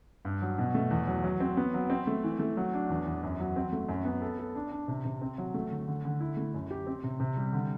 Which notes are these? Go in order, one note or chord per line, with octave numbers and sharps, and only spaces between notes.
G2
F#3
B2
A3
E2
F#3
F#3
C4
B3
F#3
C4
A3
E3
A3
F#3
D4
E2
E2
F#2
F#3
C4
A3
F#2
B3
A4
A4
D4
D4
C3
C3
C4
F#3
A3
D3
D3
D3
E4
A3
F#2
G4
C4
C3
C3
G3
D3